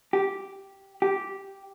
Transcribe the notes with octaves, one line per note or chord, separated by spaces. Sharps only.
G4
G4